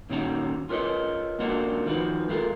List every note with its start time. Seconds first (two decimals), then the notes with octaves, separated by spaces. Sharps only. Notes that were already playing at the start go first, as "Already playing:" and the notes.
0.10 A#2 D#3 C#4 F#4 C5 A#5
0.69 F4 A#4 B4 C#5 D#5
1.39 C#2 A#3 D4 F4 F#4 A#4
1.86 D#3 F3 E4 F#4 B4
2.28 G#3 A3 F4 G#4 A#4